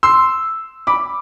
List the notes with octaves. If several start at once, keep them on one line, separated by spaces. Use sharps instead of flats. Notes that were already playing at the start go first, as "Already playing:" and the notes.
C6 E6
B5 D6